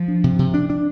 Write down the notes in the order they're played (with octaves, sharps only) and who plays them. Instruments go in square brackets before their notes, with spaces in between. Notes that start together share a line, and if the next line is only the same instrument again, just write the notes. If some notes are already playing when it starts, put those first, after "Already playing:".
Already playing: [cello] F3
[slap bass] D4
C3
C3
D4
D4